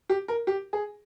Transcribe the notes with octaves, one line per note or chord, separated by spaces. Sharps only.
G4
A#4
G4
G#4